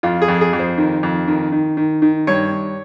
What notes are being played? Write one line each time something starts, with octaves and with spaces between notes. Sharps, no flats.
F2 F4
G#4
F2
G#4
F2
C5
D#3
F2
D#3
D#3
D#3
D#3
G2 C#5
G2